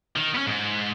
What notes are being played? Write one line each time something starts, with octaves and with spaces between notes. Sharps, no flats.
D#3
B3 C#4
G#2